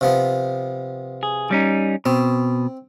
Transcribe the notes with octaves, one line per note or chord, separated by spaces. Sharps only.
C3 F3 B3
G#4
G3 C#4 D#4
B2 C4